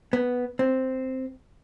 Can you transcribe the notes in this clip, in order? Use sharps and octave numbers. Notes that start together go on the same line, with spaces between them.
B3
C4